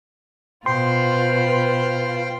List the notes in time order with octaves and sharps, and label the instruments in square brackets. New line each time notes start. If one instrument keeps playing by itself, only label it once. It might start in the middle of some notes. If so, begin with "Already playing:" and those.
[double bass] B2 [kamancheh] F4 B4 [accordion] C5 G5 [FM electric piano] C6